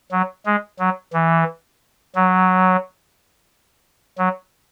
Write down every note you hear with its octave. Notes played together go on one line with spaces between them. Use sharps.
F#3
G#3
F#3
E3
F#3
F#3